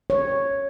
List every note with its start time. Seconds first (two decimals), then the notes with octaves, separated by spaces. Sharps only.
0.10 C#5